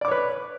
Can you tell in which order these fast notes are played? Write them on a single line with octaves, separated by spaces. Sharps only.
D5 D6 C#5 B4